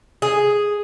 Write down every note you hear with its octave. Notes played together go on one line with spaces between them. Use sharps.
G#4